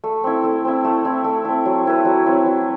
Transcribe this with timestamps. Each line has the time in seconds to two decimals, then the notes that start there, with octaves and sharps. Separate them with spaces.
0.04 A3
0.24 C4 E4
0.44 A3
0.65 C4 E4
0.84 A3
1.05 C4 E4
1.24 A3
1.45 C4 E4
1.65 F#3
1.85 C4 E4 B4
2.05 F#3
2.26 C4 E4 B4
2.46 F#3